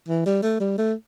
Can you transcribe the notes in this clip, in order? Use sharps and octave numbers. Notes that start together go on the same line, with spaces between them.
E3
G3
A3
G3
A3